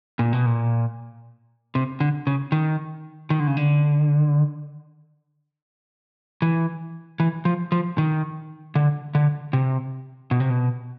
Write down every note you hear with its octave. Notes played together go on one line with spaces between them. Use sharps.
A#2
B2
A#2
C3
D3
C#3
D#3
D#3
D3
C#3
D3
E3
E3
F3
F3
D#3
D3
D3
C3
B2
C3
B2